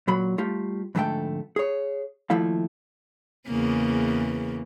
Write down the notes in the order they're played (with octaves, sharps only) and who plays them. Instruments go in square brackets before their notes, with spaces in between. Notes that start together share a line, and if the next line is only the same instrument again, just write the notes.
[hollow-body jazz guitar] A#2 F#3 B5
G3 A3 F4 G4
F2 G#2 D3 A3 A4 G5
G#4 C#5
D#2 F3 A3 E4 F5
[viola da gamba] E2 C#3 A#3